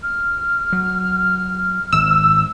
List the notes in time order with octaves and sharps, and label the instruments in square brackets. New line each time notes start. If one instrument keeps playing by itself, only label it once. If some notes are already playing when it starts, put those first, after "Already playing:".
[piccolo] F6
[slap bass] F#3
[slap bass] G#1 [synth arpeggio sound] E6